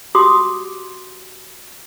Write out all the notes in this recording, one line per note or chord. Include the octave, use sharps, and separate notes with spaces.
F#4 G4 C6 D6 D#6